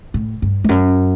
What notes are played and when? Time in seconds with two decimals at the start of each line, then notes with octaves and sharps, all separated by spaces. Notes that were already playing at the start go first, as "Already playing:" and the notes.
0.14 A2
0.42 G2
0.64 E2
0.69 F#2